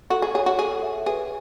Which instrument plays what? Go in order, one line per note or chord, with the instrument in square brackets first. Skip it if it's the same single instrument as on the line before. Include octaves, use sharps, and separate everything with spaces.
[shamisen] F#4 [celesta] A4
[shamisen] G#4
[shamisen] G#4 [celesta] C#5
[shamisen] F#4
[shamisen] G#4 [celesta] A4
[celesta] E5
[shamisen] G#4 [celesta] B4